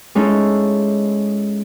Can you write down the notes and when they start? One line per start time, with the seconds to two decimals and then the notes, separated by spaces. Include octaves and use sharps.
0.15 G#3 C#4 D#4 E4 A4